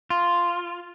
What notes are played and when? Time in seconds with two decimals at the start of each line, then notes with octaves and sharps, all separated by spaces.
0.10 F4